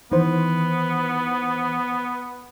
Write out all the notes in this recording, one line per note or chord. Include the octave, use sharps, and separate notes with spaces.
D#3 E3 B3 C5